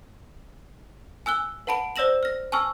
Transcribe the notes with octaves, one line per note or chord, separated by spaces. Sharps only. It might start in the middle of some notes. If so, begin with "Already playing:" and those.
G#5 E6 F#6 G7
B4 F#5 A5 B5 D7
C5 D5 E6 A#6 E7 F#7
F6 A#6
G#5 A5 C#6 E6 F6